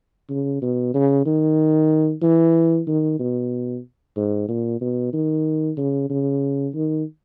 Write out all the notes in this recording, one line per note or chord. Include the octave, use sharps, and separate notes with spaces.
C#3
B2
C#3
D#3
E3
D#3
B2
G#2
A#2
B2
D#3
C#3
C#3
D#3